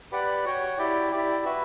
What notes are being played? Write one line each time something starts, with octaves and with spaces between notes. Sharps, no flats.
G4 B4 D5 F#5
F#4 C#5 G5
E4 G4 D5 G5
E4 G4 D5
F#4 B4 E5